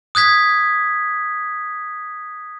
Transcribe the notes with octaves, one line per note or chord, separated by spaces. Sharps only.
D#6 F#6 G#6 B6